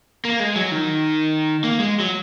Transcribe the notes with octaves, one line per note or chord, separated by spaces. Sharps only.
A#3
G#3
F#3
D#3
A#3
G#3
F#3